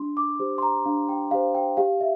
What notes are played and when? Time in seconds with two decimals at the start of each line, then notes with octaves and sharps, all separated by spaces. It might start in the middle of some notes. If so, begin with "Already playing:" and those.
Already playing: D4 C6
0.17 D6
0.39 G4 C5
0.58 C6
0.62 A#5
0.85 D4 F5
1.09 G5
1.31 G4 C5 F5
1.55 G5
1.77 G4 F5
2.01 E5